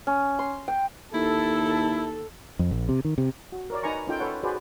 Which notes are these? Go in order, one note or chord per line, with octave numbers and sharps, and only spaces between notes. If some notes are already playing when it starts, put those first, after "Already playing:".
C#4
C6
G5
D#2 E4 A4
F2
A#1
C3
D#3
C3
F#4
A#4 C#5 D5
D#4 B4 G#5 A#5 C#6
C#4 D#4 F4 A4 G5
A4 B4 C#5 F#5
F#4 G#4 B4 C5 D5